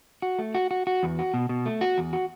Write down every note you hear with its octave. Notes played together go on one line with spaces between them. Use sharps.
F#4
A3
F#4
F#4
F#4
E2
F#4
B2
B2
A3
F#4
E2
F#4